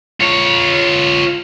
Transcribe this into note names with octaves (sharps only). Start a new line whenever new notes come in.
F4 C#5